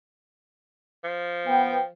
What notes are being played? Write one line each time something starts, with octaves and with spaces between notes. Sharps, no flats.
F3
B3 G5